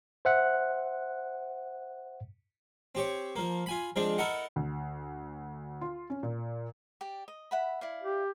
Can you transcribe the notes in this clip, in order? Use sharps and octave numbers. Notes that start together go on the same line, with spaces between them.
C5 E5 F#5 F#6
C4 G4 C#5
F3 A#3
F4 G#5 B5
F3 G#3 C4 D4
E4 A4 A#4 D#5 F#5
D2
F4
C#4
A#2
G4 D5
D#5
E5 F#5 B5
E4 D5 F5
G4